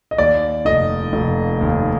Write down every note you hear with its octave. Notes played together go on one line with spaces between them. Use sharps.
D#5
D#2 D5
F1 D#5
F1
D#2